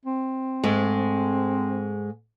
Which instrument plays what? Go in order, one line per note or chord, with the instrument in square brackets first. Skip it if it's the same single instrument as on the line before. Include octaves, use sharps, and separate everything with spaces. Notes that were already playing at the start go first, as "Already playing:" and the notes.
[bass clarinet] C4
[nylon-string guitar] G#2 G#3 A3